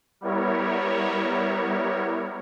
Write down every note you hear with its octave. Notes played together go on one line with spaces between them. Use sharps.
G3 B3 E4 A#4 C#5